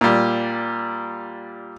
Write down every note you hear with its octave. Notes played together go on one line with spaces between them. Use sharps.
A#2 G3